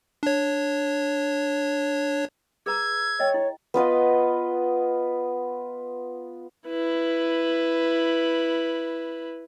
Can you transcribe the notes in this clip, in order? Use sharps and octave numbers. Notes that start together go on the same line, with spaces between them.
D4 C#5
G#4 B4 A#5 E6 G#6
C#5 D#5 G5
E4
B3 F4 B4 D#5
E4 B4